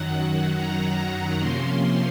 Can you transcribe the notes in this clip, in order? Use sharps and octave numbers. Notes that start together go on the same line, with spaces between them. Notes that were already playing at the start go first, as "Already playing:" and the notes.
Already playing: F#2 D#3 F#3 F#5
A#5
C3 F3 A#3 C#4 C6